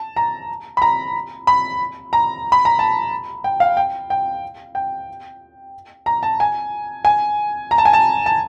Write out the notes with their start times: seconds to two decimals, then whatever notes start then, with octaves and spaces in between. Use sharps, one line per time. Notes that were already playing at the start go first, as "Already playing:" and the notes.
Already playing: A5
0.16 A#5
0.77 B5
0.82 A#5
1.47 B5
2.13 A#5
2.52 B5
2.65 A#5
2.79 A5
3.44 G5
3.60 F5
3.77 G5
4.10 G5
4.75 G5
6.06 A#5
6.23 A5
6.40 G#5
7.05 G#5
7.71 A#5
7.78 A5
7.85 G#5
7.93 A5
8.26 A5